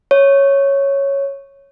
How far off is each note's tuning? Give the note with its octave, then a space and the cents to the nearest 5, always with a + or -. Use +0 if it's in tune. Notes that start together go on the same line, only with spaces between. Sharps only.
C#5 -5